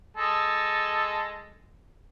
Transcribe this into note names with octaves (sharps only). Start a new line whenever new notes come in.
G#3 A4